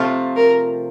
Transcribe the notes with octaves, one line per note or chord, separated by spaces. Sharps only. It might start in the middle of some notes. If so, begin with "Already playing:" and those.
Already playing: C3 F3 A3 C4 F4
A#4